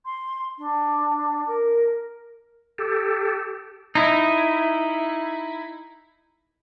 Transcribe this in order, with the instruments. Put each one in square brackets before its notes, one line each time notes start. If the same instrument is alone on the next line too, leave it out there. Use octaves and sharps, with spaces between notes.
[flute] C6
D4
A#4
[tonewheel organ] G4 A4
[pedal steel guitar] D#4 E4